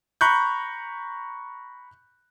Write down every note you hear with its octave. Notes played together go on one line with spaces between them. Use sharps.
A#5 B5 C#6 F#6 G6